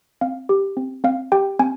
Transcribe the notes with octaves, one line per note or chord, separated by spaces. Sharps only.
C4 F5
G4
C4
C4 F5
G4 G5
C4 G#5